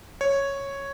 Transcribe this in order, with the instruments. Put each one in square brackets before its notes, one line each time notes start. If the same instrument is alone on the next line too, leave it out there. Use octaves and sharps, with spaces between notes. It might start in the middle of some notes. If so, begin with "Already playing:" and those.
[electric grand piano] C#5